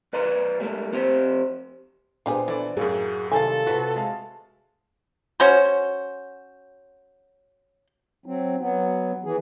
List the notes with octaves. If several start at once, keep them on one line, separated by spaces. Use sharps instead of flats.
B1 B4 D5 A#5 C6
G3 A3 A#3
F2 C4 G4 C5 C#5 C6
A#2 B3 D4 G4 G#4 C5
D3 E3 D5
F#2 A2 F#3 A#3 F#4 G#4
C3 D#3 G3 A4 F5 G#5
C3 F4 F#4 B4 E5
G#3 F5 A5
C#4 F#4 C5
F#3 C4
F#3 B3
E3 G#4